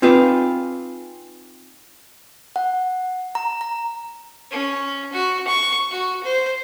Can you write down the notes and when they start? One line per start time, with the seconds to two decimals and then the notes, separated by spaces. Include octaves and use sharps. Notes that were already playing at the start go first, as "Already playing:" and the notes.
0.02 C4 D#4 F4 G#4 B4 D5
2.56 F#5
3.35 A#5
3.61 A#5
4.51 C#4
5.13 F#4
5.48 C#6
5.91 F#4
6.24 C5